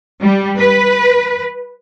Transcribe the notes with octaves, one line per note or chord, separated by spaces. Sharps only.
G3
B4